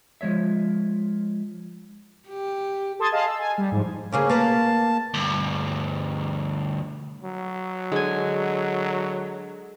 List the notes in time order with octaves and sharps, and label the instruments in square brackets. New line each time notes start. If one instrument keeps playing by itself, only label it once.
[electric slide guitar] F3 G#3 C#5 E5
[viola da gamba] G4
[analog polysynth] A4 A5 C6 D#6 G#6 A6
G#4 D#5 F5 A5
E6
G#5
G3
G#2 F3
[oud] D2 C#3 G#4 [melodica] A#3 C#4
[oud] A#3 B4 [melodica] A5
[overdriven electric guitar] D2 G2
[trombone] F#3
[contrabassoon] D3 [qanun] G#3 G#5